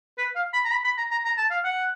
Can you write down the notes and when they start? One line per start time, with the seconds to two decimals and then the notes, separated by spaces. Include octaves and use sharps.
0.18 B4
0.36 F5
0.53 B5
0.65 A#5
0.71 B5
0.84 B5
0.98 A#5
1.11 A#5
1.25 A#5
1.38 A5
1.51 F5
1.65 F#5